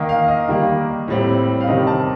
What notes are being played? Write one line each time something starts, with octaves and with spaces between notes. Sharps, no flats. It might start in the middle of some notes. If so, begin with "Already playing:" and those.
Already playing: D#3 A#3 D#5
F5
D#5
D#3 G3 A#3
A2 G3 C4
F5
C3 D#3 G3 C4 D#5
A5